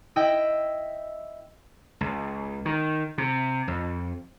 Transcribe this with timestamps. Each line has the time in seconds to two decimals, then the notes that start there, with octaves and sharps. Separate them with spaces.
0.16 E4 D#5 E5 G5
2.01 C#2
2.65 D#3
3.18 C3
3.68 F2